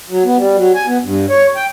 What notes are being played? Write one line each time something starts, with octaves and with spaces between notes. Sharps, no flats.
F#3
B3
G3
F#3
G#5
B3
G2
C#5
G5